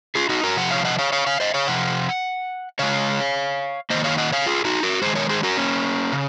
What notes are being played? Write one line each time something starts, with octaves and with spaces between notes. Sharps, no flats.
F4 G#4
D#4 F#4
F#4 A#4
C3 F3 F#5
C#5 F5
D#5 F#5
C#5 F5
C#5 F5
C#5 F5
C5 D#5
C#5 F5
C3 F3 F#5
C#3 G#3 C#5 F5
D#3 A#3 C5 D#5
C#5 F5
D#5 F#5
C#5 F5
F4 G#4
D#4 F#4
F#4 A#4
D#3 G#3 G#4 C5
A#4 C#5
G#4 C5
F#4 A#4
A#3 C#4
C#3